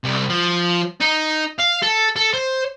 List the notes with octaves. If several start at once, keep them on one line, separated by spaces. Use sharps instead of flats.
C2
F3
D#4
F5
A4
A4
C5